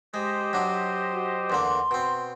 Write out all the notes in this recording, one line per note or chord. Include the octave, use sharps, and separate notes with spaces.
G#3 G4 C5 D#5
F#3 D4
F#4
E2 D3 A#3 C6
B2 C4